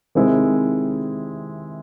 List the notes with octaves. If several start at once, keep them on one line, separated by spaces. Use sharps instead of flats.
C3 D#3 G#3 C4 E4